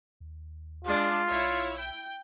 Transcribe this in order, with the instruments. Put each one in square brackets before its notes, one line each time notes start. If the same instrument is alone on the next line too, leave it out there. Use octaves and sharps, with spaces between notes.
[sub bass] D#2
[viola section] G#3 D4 D5 [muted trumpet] F4
[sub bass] B1 [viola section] E4 C#5
[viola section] G5